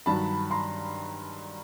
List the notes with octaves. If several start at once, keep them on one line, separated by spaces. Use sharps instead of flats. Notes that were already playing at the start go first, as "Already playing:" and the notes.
G2 D#3 F#3 A5 B5
A#5 C6